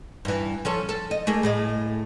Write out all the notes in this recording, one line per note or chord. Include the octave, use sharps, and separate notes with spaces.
G2 E3
F3 C#4 A4
A4
D#5
A3 A#3 G#4
A2 G#4 D#5